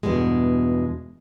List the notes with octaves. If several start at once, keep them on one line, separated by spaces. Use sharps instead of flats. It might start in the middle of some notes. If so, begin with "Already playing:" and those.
E2 G2 B2 G#3